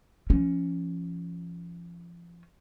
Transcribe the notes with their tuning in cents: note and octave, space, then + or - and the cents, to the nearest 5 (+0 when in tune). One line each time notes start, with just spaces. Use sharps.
F3 -30 C#4 +0